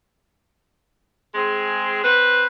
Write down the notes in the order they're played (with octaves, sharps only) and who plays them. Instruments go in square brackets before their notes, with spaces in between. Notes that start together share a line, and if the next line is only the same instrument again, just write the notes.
[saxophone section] G#3 C4 G#4
C4 B4